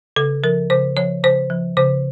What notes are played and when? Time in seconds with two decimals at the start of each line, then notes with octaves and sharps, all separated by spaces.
0.16 C#3 A4
0.44 F3 A#4
0.70 C#3 C5
0.97 F3 C#5
1.23 C#3 C5
1.50 F3
1.77 C#3 C5